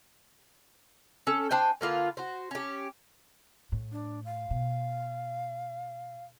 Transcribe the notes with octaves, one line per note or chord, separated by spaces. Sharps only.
C#4 A4
D4 C5 G5 G#5
D3 A#3 F4 B4
F#4 C5
C#4 G4
A2
D4
F5
B2